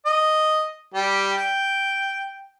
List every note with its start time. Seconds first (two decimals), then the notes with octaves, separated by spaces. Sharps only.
0.06 D#5
0.94 G3 G4
1.37 G5